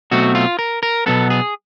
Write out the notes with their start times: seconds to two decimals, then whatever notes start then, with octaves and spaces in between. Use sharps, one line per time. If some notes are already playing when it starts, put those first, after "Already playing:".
0.11 B2 F#3 A3 C4 F#4
0.35 F4
0.59 A#4
0.83 A#4
1.06 B2 F#3 B3 A4
1.30 G#4